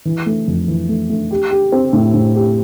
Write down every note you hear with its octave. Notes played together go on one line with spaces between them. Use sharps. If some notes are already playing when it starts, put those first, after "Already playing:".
E3
A3
F2
E3
A3
A3
G4
G4
C4
A2
A2
G4